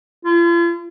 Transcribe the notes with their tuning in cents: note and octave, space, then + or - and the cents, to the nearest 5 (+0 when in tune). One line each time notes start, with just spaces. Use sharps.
F4 -45